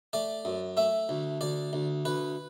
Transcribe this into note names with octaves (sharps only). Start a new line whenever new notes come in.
A3 D5
F#2
A3 E5
D2
D2 D5
D2
D2 B4